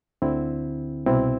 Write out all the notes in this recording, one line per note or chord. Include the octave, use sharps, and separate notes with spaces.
D2 D3 C4 E4
C2 B2 C4 E4